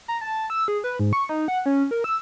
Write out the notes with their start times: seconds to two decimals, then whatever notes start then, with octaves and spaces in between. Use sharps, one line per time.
0.08 A#5
0.21 A5
0.50 E6
0.68 G#4
0.84 B4
0.99 G#2
1.13 C#6
1.29 D#4
1.48 F#5
1.66 C#4
1.91 A#4
2.04 E6